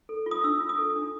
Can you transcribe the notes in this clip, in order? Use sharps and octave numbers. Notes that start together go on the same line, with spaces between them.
A4
F4
D#6
D4 E6
F4
D#6
A4
D4